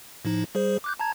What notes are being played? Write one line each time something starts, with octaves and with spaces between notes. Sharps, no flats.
A2 F3 D#4
G3 G#4 C5
D6 F#6 G6
A5 A#5 G#6